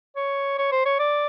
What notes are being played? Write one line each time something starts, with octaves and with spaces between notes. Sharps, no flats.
C#5
C#5
C5
C#5
D5